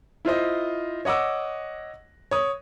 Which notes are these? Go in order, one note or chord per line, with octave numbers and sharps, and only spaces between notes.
E4 F4 C5 D#5
C#5 D#5 F#5 D6 E6
C#5 D#6